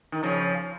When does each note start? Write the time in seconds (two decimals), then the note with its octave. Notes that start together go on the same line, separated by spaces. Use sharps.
0.12 D#3
0.23 C#3 F3